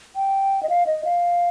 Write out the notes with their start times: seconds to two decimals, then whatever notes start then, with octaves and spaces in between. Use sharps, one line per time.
0.16 G5
0.63 D#5
0.69 F5
0.87 D#5
1.05 F5